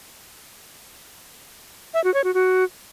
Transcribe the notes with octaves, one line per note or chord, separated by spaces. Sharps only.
E5
F#4
C#5
F#4
F#4